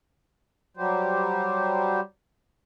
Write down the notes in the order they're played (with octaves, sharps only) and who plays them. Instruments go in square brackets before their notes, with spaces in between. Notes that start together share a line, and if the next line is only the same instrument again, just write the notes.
[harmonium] F#3 G3 G4 C5